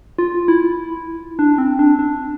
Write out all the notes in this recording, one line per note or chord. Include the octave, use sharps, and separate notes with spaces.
F4
E4
D4
C4
D4
D4